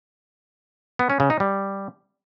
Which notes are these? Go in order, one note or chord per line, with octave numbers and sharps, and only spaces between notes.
B3
C#4
C#3
D#4
G3